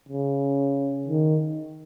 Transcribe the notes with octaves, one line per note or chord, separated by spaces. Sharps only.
C#3
D#3